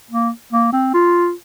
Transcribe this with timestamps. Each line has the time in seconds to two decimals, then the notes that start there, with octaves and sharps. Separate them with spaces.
0.11 A#3
0.53 A#3
0.73 C4
0.94 F4